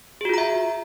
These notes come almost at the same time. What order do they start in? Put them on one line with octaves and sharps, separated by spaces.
G#4 F#4 F4 A#5 E5